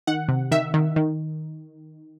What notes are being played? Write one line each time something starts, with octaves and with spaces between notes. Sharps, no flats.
D#3 F#5
C3
D#3 E5
D#3
D#3